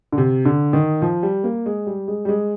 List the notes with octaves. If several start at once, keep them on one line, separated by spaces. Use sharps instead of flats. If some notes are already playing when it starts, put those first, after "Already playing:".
D3
C3
D3
D#3
F3
G3
A#3
G#3
G3
G#3
G3
G#3